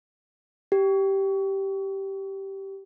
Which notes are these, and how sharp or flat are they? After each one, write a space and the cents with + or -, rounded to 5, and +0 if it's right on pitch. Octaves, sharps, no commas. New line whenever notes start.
G4 -10